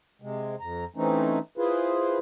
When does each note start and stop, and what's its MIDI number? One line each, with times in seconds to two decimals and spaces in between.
0.22 0.55 48
0.22 0.55 56
0.60 0.85 41
0.60 0.85 82
0.96 1.39 52
0.96 1.39 57
0.96 1.39 60
0.96 1.39 61
0.96 1.39 63
1.58 2.18 64
1.58 2.18 65
1.58 2.18 68
1.58 2.18 71
1.58 2.18 72